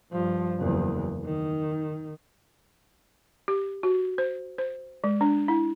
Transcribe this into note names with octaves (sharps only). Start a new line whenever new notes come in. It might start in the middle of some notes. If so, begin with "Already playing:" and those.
G2 F3
F#1 E2
D#3
G4
F#4
C5
C5
G#3
D4
E4